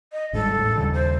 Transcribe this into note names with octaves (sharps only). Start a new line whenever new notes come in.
D#5
G#1 G#2 G3 A4
E1 A2
D#2 C#3 G3
C5